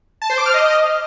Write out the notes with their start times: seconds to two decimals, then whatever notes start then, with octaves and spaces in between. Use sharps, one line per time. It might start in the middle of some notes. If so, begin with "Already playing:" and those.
0.22 A5
0.30 C5
0.38 D6
0.46 F6
0.54 D#5